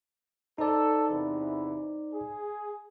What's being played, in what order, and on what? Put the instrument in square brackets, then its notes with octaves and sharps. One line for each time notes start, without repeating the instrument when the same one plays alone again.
[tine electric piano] D#4 C5 D5 [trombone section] A4
[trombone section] E2 C3 E3
G#4